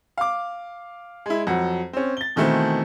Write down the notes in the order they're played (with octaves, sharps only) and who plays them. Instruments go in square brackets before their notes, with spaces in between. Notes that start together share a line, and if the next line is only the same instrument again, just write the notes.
[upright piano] F5 D6
G#3 E4
F2 F#3 F#5
C4 C#4
A6 G7
B2 D#3 E3 A3 C4